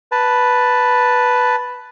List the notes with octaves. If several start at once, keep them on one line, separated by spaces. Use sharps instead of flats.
B4 A5